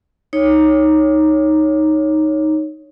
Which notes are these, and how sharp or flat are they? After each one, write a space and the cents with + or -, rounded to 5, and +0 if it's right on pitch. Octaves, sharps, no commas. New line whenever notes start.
D#4 +0 C#5 +0